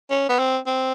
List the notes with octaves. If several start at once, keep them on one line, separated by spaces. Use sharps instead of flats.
C#4
B3
C4
C4